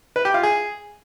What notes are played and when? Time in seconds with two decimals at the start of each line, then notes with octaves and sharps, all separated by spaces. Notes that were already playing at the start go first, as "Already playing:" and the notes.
0.16 B4
0.25 G4
0.34 F4
0.43 G#4